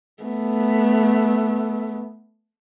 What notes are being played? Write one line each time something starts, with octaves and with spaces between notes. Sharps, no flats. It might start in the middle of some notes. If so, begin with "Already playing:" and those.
A3 B3